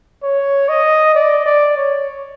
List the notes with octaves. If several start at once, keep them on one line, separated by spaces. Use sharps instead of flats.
C#5
D#5
D5
D5
C#5